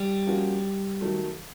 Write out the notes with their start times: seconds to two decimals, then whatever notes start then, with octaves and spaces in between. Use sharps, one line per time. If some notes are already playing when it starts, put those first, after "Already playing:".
Already playing: G3
0.27 F3 A#3 C#4 F#4
1.01 D#3 F#3 A3